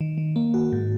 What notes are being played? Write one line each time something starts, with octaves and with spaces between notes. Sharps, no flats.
D#3
D#3
A#3
F#4
G#2